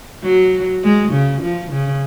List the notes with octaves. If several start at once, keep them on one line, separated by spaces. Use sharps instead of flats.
F#3
G#3
C#3
F3
C#3